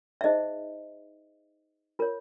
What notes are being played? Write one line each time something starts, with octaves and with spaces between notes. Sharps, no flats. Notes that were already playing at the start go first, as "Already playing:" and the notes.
E5
D#4 G#4 C5 D#5
F4 A#4 C#5